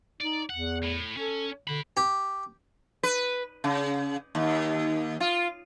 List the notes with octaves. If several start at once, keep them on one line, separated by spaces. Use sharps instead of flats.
D#4 D5
E2 F#5
A2
C#4 A4
D3 F#4 B5
G4
B4
C#3
D#2
F4